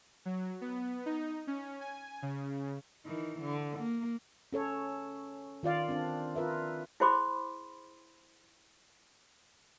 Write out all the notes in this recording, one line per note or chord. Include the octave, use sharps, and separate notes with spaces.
F#3
B3
D#4
C#4
G#5
C#3
D#3 E3
D3
A#3
C#4 A4 C#5
D#3 F4 D5 F5
C4 D4
F4 A#4 B4 E5
E4 G#4 C5 B5 C6 D6